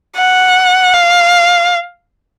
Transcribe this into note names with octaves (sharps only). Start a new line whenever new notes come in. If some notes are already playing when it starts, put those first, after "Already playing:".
F#5
F5